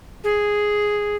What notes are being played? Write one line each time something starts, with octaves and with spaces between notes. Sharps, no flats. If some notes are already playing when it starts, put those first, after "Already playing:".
G#4